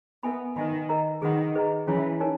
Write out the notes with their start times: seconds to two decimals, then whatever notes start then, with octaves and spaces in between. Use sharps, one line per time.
0.23 B3 A#4 E5 G#5 B5
0.56 D#3 B4 E5 G#5 B5
0.89 A#4 D#5 A#5
1.22 D#3 G#4 B4 F#5 B5
1.55 G#4 B4 D#5 A#5
1.87 E3 C#4 E4 G#4 C#5 G#5
2.20 D#4 A#4 C#5 G#5